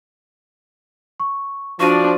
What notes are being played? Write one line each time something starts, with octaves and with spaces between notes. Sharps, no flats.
C#6
F3 D4 F#4 D5 C#6 D#7